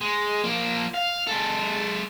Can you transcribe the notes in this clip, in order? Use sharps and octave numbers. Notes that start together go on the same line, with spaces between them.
G#3
F3 A#3
F5
G#3 A4